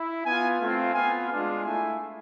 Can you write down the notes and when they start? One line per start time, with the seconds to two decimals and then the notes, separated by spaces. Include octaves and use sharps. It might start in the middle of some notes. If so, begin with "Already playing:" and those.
Already playing: E4
0.26 B3 F4 G#5
0.60 A3 C4 F4
0.94 B3 F4 G#5
1.29 G#3 D4 F4
1.63 A3 E4 G#5